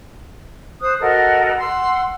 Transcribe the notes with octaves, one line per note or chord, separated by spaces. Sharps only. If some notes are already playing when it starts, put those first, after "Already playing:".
C5 D#6 F#6
F#4 A4 A#4 D#5
F#5 C6 E6